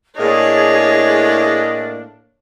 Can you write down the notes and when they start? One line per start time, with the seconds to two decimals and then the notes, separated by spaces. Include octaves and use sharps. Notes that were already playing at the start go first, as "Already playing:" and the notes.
0.18 A2 A#3 D4 G#4 C#5 D#5